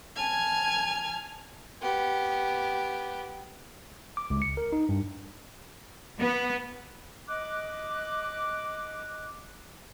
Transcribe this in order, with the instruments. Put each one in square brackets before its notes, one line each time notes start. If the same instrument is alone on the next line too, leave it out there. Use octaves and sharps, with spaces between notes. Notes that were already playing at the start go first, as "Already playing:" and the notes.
[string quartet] G#5 A5 F6 G#6
[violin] B3 G4
[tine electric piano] D6
C#2
C#7
A#4
D#4
G2
[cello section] B3
[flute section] D#5 D6 F#6